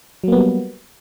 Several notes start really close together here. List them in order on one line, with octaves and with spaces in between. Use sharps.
F#3 A#3 B3 G3